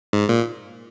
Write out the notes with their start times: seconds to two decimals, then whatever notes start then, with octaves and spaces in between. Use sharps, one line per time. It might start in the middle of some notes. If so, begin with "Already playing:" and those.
0.13 G#2
0.29 A#2